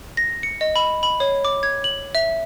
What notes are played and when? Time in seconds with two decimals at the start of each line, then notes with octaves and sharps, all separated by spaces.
0.17 A#6
0.43 C#7
0.61 D#5
0.76 B5
1.03 B5
1.20 C#5
1.45 D6
1.63 G#6
1.84 F#7
2.15 E5